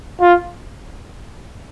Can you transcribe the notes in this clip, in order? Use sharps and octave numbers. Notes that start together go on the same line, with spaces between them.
F4